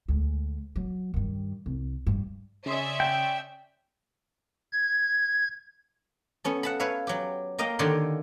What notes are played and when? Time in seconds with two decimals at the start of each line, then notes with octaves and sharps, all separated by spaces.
0.08 D2 G#3
0.76 F#3
1.14 G2 D#3
1.66 C2
2.07 G2
2.66 C#3 C#4 D5 E5 C6 D#6
3.00 G5
4.73 G#6
6.44 B3 C#4 A4
6.63 F#5 A5 B5
6.80 B4 C#5 E5 F5
7.07 F#3 G4
7.59 A#3 A#4 D#5 F5 G5
7.79 D3 D#3 G4 C#5 D5 C6